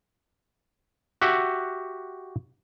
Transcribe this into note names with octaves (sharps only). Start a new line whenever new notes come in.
F#4 G4 E5 F#5